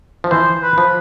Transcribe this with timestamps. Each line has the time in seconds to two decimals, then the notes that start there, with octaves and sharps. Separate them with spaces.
0.24 F3
0.31 E3 C5
0.62 B4
0.78 F3